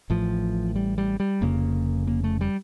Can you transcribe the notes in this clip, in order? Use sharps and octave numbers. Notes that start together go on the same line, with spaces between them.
A1 A2 F3
G3
G3
G3
F1 F2 C#3 A#3
A#3
A3
G3